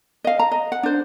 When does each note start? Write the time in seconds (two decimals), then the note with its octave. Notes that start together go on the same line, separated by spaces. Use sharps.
0.24 D#5 F5
0.39 A#5
0.51 D#5
0.72 F#5
0.83 D4 C5